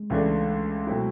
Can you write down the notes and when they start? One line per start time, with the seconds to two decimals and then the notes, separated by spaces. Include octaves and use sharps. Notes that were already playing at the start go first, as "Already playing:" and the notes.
Already playing: G#3
0.10 C#2 C#3 E3 A3 D4
0.87 B2 F#3 A3 C4 E4